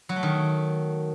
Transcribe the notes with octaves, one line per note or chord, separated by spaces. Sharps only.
F#3
A3
D#3